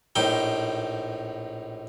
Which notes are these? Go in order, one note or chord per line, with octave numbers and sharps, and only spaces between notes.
A#1 A2 D#4 G5